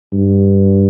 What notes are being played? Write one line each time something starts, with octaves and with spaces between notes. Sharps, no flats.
G2